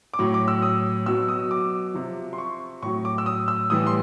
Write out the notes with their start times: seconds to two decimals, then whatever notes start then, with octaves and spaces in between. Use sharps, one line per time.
0.14 D6
0.19 A2 F#3 C#6
0.34 D6
0.48 E6
0.62 D#6
1.06 B2 F#3 E6
1.28 D#6
1.51 D6
1.94 C3 F3
2.33 C6
2.38 C#6
2.82 A2 C#6
2.86 F#3
3.05 D6
3.18 E6
3.26 D#6
3.48 E6
3.70 A2 E3 G3 D#6
3.87 C6